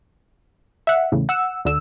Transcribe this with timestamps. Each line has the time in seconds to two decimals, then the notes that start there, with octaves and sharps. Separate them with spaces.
0.87 E5 F#5
1.12 E2 A2 C#3
1.29 F#5 E6
1.65 D2 D3 E6